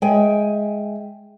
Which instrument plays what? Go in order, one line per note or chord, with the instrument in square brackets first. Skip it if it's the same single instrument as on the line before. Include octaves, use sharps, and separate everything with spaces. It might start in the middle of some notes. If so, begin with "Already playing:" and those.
[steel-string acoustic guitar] G#3 E5 G5 G#5